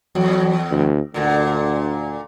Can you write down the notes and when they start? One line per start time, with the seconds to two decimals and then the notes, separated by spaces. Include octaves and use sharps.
0.15 E2 F#3
0.71 D2
1.14 D2 A#2 D3